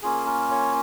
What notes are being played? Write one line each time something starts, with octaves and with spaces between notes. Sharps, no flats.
A#3 C#4 F4 G#4
A#4
C#5